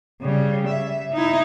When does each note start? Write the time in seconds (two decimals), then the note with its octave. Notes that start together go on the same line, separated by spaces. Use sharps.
0.22 C#3 G3
0.66 E5
1.13 D#4 E4